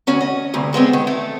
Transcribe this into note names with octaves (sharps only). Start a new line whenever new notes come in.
D2 C#4 F#4
D#5
D2 G2 C3
C#3 G#3 B3 C4
D#3
A3 A4